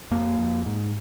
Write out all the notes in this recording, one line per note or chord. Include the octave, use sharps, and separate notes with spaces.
F2 A#3
F2
G#2